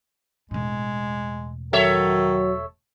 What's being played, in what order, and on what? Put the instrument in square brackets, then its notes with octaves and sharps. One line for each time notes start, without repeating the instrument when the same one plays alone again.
[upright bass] E1 A2 [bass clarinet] G#3
[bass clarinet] D#3 [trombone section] F#3 [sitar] A4 C#5 E5